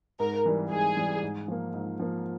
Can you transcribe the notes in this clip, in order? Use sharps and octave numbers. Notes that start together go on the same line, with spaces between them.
G#2 A#4
E3 G3
G#2 G#4
E3 G3
G#2
F3 A#3
G#2
F3 A#3